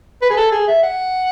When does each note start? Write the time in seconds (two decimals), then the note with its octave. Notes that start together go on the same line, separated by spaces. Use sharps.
0.22 B4
0.30 G#4
0.37 A4
0.52 G#4
0.68 E5
0.83 F#5